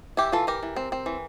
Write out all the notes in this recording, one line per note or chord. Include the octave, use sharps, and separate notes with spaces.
E3 E4 G4
E3 F4 A4
E3 G4 A#4
E3
C4
C4
E3